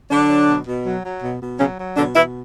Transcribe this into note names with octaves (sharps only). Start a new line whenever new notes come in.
D3 F#3 D4
F#3
B2
B2
F#3
F#3
B2
B2
C#3 F#3 C#4
F#3
B2 D3 D4
B2 E3 E4